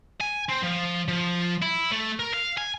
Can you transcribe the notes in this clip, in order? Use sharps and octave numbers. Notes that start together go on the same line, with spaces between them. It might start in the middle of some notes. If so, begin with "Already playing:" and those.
G#5
C4
F3
F3
E4
A3
A#4
F5
G#5